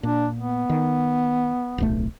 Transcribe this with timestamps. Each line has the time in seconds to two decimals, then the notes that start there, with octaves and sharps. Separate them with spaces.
0.03 A#2 D4
0.36 B3
0.70 D#3
1.78 D1 B1 A3